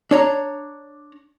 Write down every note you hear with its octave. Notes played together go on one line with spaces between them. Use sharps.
D4 C#5 A#5